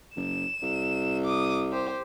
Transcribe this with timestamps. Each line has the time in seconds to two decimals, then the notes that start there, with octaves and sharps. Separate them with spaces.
0.16 F#1 E7
0.62 C2
1.24 D6 D#6
1.72 G4 C5